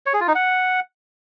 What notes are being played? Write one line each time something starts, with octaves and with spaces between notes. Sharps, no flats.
C#5
G#4
F4
D#4
F#5